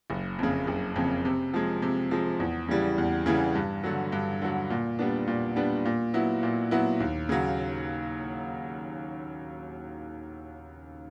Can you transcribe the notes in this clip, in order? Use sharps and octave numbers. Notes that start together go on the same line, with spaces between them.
F#1
F2 C#3
F#1
F2 C#3
C3
F3 G#3
C3
F3 G#3
E2
C#3 E3 G3
E2
C#3 E3 G3
G2
D3 F#3
G2
D3 F#3
A#2
G3 B3 D4
A#2
G3 B3 D4
A#2
F#3 B3 E4
A#2
F#3 B3 E4
D#2
C#3 F#3